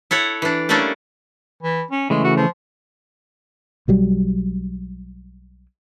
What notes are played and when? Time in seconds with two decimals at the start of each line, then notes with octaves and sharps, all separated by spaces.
0.11 E4 A4 C#5 F#5
0.42 E3 D4
0.69 G3 A3 A#3 C#4 D4 A4
1.63 E3
1.91 C#4
2.10 C#3 E3 G#3 A3
2.24 F#4
2.36 F3
3.88 B1 F#3 G3